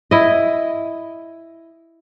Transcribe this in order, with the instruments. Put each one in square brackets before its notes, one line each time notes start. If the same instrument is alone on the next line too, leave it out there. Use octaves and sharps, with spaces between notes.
[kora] E4 D#5